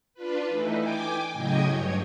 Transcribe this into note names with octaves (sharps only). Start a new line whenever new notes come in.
D4 F4 B4
E3 A3 D#4
G5 G#5 D6
A2 C#3 F#3 D#5 G5 G#6
G2 C#5